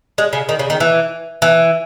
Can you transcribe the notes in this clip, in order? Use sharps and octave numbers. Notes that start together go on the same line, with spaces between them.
G#3
C#3
D#3
C#3
D#3
E3
E3